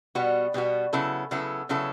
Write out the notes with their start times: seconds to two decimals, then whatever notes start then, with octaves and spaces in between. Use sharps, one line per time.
0.15 B2 G3 B3 F#4
0.54 B2 G3 B3 F#4
0.93 C#3 F#3 B3 E4 A4
1.31 C#3 F#3 B3 E4 A4
1.69 C#3 F#3 B3 E4 A4